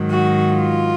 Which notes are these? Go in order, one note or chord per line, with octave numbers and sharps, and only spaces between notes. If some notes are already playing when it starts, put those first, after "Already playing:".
Already playing: G#2 D#3 F#3
F#4
F4